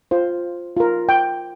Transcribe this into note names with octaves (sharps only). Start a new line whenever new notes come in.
F4 C5
F4 A#4
G5